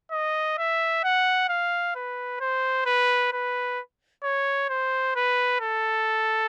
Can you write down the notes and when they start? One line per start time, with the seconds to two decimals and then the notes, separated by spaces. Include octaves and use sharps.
0.12 D#5
0.58 E5
1.04 F#5
1.49 F5
1.95 B4
2.40 C5
2.86 B4
3.33 B4
4.24 C#5
4.69 C5
5.16 B4
5.61 A4